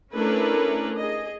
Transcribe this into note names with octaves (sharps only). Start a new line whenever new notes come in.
A3 C#4 D4 E4 A#4 B4
G#4 D#5